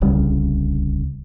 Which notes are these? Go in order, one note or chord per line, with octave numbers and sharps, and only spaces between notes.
D1 C2 C#3 G3